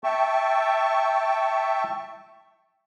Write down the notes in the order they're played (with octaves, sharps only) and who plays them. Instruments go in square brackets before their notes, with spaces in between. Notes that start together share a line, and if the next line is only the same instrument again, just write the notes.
[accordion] E5 G5 A5 C#6